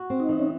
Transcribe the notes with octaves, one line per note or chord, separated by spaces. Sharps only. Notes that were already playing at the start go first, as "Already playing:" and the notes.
Already playing: F#4
C4
D#4
E3
C#4